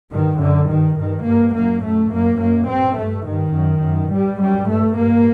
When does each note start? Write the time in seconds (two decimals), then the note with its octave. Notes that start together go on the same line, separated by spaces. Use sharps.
0.11 G2 D#3
0.40 F#2 D3
0.69 G2 D#3
0.97 G2 D#3
1.26 G2 A#3
1.54 F#2 A#3
1.83 F#2 A3
2.11 F#2 A#3
2.40 F#2 A#3
2.68 G2 C4
2.97 G2 A3
3.26 G2 D#3
3.54 F#2
3.83 F#2
4.11 G2 G3
4.39 F#2 G3
4.68 G2 A3
4.97 G2 A#3